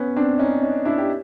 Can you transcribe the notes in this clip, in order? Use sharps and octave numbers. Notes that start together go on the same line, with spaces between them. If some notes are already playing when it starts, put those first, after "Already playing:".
Already playing: B3 C#4
C4 D4
C#4 D#4
C#4 D#4
D4 E4
G4